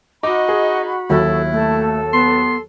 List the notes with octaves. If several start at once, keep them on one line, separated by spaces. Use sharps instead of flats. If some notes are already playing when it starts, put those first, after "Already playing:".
D#4 F#4 D#5 B5 D6
G#4
D#2 F#3 E4 A4
A3 A4
B3 C6